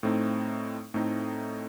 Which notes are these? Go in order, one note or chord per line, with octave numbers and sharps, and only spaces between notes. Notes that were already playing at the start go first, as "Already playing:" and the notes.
A2 A3 C4 D#4
A2 A3 C4 D#4